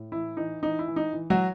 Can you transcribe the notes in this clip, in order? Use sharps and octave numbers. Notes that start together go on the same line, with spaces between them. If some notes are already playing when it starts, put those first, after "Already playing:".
Already playing: A2
E3 E4
E3 D#4
E3 D#4
E4
E3
D#4
E3
F#3 F#4